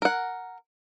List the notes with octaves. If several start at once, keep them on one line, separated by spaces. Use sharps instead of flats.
A#4 F#5